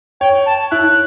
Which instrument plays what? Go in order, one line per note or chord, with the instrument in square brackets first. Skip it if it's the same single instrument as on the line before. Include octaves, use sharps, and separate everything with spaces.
[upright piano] C#5 [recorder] G5
[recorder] A5
[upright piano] E4 [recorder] F#6